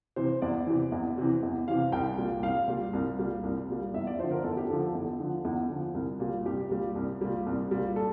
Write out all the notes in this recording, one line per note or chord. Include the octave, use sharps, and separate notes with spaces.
C3 E3 C5
E2 D5
C3 E3
E2
C3 E3
E2
C3 E3 F5
C2 G5
A#2 G3
C2 F5
A#2 G3
C2
A#2 G3
C2
A#2 G3
E2 E5
D5
F3 C5
D3
A#4
E2 A4
G4
D3 F3 A4
A4
E2
D3 F3
E2
D3 F3
C2
A#2 G3
C2 G4
A#2 G3
C2
A#2 G3
C2
A#2 G3
A4